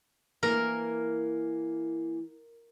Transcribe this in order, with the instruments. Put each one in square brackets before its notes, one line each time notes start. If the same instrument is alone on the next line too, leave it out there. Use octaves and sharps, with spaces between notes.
[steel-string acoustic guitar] E3 A#3 [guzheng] A#4